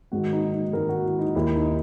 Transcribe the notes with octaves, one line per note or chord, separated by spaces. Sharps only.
G#2 D#3 F#4
D#4
D#4
G#2 D#3 A#4
F#4
E4
D#4
D#2 D#3 E4
D#4